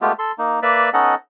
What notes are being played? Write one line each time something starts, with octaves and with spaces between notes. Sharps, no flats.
G#3 A3 B3 F4 G4
A4 C6
A#3 D#4
A#3 B4 D5 E5
B3 C#4 D#4 A4 D#5 F#5